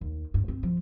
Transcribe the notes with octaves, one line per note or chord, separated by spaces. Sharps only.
D#2
G2
C4
F3